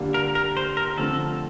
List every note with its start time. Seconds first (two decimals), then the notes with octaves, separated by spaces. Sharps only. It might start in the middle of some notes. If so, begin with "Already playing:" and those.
Already playing: D3 G3 A#3 D4 F4
0.14 A#4
0.35 A#4
0.57 C5
0.77 A#4
0.97 D3 F3 A3 C4 A4